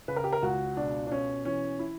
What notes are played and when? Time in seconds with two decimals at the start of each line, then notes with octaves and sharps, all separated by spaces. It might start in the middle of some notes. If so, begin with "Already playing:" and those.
0.08 C#3 B4
0.16 A#4
0.24 G4
0.33 A#4
0.42 C#2 F#4
0.77 B2 D4
1.07 D4
1.11 B2 C#4
1.45 E3 C#4
1.79 E4